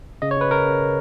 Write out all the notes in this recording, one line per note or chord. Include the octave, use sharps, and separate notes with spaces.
C#3 D#5
C#5
C#3 B4
C#3 A#4
C#3